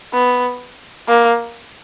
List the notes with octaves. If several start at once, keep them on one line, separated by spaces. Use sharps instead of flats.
B3
A#3